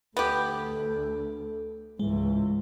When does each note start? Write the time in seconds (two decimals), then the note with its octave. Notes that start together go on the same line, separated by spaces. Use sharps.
0.17 D2 B3 G4 A4
1.99 C#2 G#2 E3 G#3